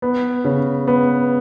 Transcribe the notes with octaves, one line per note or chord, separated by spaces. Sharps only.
B3
C#3
B3